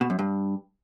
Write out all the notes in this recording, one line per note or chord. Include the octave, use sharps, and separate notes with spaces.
B2
F#2
G2